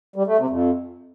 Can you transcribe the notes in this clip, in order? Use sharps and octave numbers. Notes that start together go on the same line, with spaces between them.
G3
A3
C3
F2